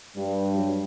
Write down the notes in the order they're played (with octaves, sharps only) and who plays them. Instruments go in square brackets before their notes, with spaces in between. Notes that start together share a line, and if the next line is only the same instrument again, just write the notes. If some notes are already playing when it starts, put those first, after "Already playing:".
[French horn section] G2 [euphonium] G3
[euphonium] F#3